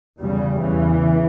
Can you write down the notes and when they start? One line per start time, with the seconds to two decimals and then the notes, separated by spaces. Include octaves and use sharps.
0.20 E2 C#3 G3
0.60 E2 C#3 E3